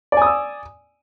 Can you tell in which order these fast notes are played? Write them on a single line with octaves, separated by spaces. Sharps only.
D5 G#5 D#6 E6